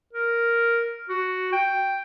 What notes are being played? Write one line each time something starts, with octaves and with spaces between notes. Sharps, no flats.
A#4
F#4
G5